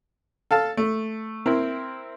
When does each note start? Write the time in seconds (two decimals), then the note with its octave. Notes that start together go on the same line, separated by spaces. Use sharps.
0.51 A4 F5 A5
0.77 A3
1.46 C4 E4 A#4